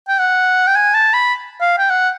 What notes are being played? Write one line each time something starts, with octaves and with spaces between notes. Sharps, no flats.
G5
F#5
G5
G#5
A5
B5
F5
G5
F#5